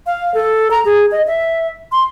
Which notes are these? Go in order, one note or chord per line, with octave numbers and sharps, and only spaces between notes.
F5
A4
A#5
G#4
D#5
E5
C6